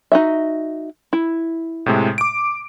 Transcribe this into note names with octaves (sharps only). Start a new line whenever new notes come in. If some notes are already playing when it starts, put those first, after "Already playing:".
D#4 F#4 E5
E4
A2 C3 G#3
D6 D7